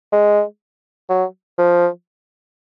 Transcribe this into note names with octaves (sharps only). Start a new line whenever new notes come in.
G#3
F#3
F3